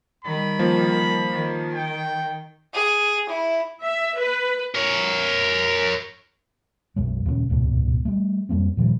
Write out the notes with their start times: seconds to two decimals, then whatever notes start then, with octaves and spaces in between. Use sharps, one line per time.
0.25 D#3 G3 B5
0.59 F3 A#3
1.32 D#3
1.75 G5
2.73 G#4
3.29 E4
3.83 E5
4.17 B4
4.74 A#4 C#5
6.96 B1 F#2 F#3 G#3
7.26 D#1 C#3 C4 C#4
7.49 D#1 C#2 G#2 B2
8.05 G3 A3
8.49 F2 G3 A#3 C4
8.77 A#2 D#3 F3 G3